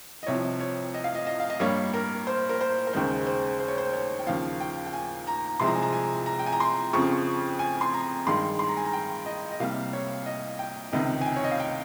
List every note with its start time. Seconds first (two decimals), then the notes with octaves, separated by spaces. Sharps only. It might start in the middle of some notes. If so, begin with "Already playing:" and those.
0.23 D#5
0.27 C2 C3 F3 C#5
0.60 C#5
0.94 D#5
1.04 F5
1.15 D#5
1.27 D#5
1.40 F5
1.50 D#5
1.60 G2 G3 A#3 C#5
1.94 A#4
2.27 C5
2.49 A#4
2.61 C5
2.87 A#4
2.93 D#2 C#3 G#3 C5
3.26 C5
3.60 C5
3.68 C#5
3.78 C5
3.93 C#5
4.19 G5
4.26 D#2 C#3 F3 F5
4.60 G5
4.86 G5
4.93 G#5
5.27 A#5
5.60 C2 C3 F3 G#3 C6
5.67 A#5
5.75 G#5
5.83 A#5
5.93 G#5
6.26 A#5
6.39 G5
6.46 G#5
6.52 A#5
6.60 C6
6.93 F2 C#3 F3 C#6
7.59 G#5
7.81 C6
7.94 A#5
8.27 G2 D#3 G#3 C6
8.59 C6
8.68 A#5
8.77 G#5
8.85 A#5
8.93 G5
9.26 D#5
9.52 D#5
9.60 C2 C3 G3 A#3 F5
9.93 C#5
10.26 D#5
10.59 G5
10.92 C#2 C3 D#3 D#5
11.21 G#5
11.26 G5
11.36 C#5
11.44 D#5
11.51 F5
11.60 G5